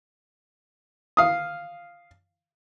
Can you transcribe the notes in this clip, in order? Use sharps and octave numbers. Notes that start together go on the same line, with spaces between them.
F5 D#6